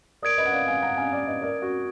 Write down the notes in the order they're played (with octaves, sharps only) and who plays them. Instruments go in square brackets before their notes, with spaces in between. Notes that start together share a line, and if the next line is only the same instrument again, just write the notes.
[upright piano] A#4 D5 [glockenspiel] D#6 G#6 D7
[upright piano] B4 D#5
F#5
D5 F5
F5 G#5
F#5 A#5
F5 G#5
D5 F5
B4 D#5
A#4 D5
F#4